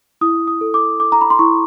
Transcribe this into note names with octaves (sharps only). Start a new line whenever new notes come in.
E4 D#6
D#6
A4
D6
A4 D6
A#5
B5
C6
E4 C#6